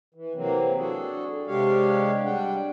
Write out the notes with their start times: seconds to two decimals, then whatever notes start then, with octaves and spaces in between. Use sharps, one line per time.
0.14 E3
0.35 C3 E3 F#3 A#3 C4
0.78 D4 F#4 G#4 A4
1.47 C3 G#3 D4 G4 C#5 F5
2.24 G3 D4 F#5 G5